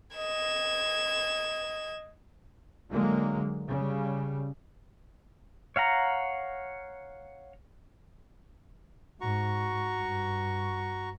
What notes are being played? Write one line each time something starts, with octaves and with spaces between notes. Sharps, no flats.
D#5 G#6 E7
D3 F#3 G#3 A#3
C#3 G3
C#5 F5 F#5 A#5
G#2 F#4 A#5 C#6
G2